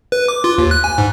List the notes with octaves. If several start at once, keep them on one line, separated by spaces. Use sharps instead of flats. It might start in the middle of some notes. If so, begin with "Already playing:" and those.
B4
D6
F4
D#2
F#6
G#5
G#2